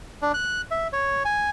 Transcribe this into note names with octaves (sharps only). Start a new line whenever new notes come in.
D4
F#6
E5
C#5
G#5